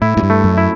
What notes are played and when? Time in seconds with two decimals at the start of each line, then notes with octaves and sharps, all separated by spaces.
0.02 A2 E4
0.17 A2
0.23 G2
0.30 A3
0.44 F#2
0.57 E4